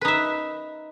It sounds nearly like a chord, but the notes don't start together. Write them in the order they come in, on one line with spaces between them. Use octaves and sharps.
B4 D#4 E5